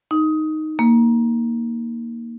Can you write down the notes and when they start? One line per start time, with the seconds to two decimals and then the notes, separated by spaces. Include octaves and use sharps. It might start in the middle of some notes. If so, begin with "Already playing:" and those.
0.11 D#4
0.79 A#3